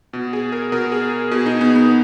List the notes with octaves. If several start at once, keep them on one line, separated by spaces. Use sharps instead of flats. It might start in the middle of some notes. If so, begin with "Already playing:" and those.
B2
G#4
A#4
B2 A#4
G#4
B2 G#4
D#4
B3
B3